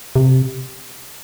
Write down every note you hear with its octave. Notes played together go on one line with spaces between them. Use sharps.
C3